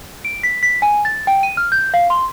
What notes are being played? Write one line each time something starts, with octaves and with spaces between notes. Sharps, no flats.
D7
B6
B6
G#5
A6
G5
D#7
F6
G6
F5
C6